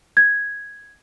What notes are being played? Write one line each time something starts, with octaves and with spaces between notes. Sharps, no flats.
G#6